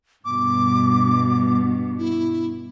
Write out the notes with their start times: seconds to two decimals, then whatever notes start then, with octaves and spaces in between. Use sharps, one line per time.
0.25 G2 B2 D6
1.99 E4